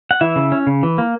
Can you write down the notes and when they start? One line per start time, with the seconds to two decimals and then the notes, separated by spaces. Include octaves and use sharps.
0.11 F#5
0.21 E3 E4 E5
0.36 C#3
0.52 C#4
0.67 C#3
0.83 E3
0.98 A#3